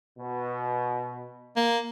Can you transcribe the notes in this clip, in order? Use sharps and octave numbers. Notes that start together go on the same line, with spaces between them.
B2
A#3